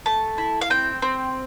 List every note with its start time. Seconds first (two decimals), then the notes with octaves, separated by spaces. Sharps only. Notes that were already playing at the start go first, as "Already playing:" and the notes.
0.06 A3 A5
0.38 E4
0.61 F5
0.70 C4 G5
1.02 C4